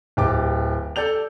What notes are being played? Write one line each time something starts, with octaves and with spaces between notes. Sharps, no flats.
D1 G4 D6
A4 D5 G6 F7